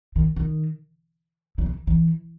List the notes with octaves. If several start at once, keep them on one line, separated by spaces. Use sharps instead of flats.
D#3
D#3
F#3
E3
E3